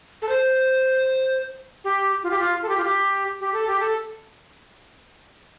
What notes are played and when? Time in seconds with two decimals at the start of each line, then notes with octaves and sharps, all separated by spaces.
0.22 A4
0.29 C5
1.84 G4
2.23 F4
2.31 G4
2.39 F4
2.62 A4
2.69 G4
2.77 F4
2.84 G4
3.41 G4
3.53 A4
3.67 G4
3.80 A4